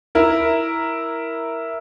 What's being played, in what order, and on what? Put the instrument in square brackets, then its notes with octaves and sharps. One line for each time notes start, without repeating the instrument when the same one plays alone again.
[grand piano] E4 A#4